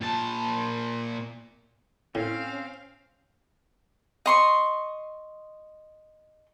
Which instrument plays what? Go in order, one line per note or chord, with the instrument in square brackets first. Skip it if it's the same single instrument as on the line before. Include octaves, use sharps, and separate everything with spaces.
[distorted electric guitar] A#2 A5
[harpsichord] A2 [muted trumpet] C4 [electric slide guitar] C#4 [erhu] F5
[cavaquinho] D#5 C6 C#6